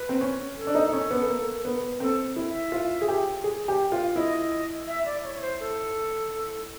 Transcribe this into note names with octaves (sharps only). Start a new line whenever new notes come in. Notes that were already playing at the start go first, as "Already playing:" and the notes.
Already playing: B4
C4
C#4
A4
D4
D#4
C#4
B3
A#3
B3
C4 A4
E4
E5
F4
G#4
G4
G#4
G4
F4
E4 D#5
E5
D5
C#5
C#5
C5
A4